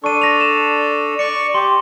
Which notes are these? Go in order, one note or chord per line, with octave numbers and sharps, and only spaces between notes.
D4 A4 C#6 D#7
A#6 F7
E7
D5 C#6 C#7
G4 C6 D6